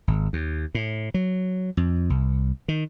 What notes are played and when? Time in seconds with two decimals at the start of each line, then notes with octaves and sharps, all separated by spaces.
0.08 G#1
0.33 D#2
0.75 A2
1.14 F#3
1.77 F2
2.10 C2
2.68 D#3